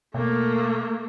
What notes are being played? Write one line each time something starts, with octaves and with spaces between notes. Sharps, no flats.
B2 A3 A#3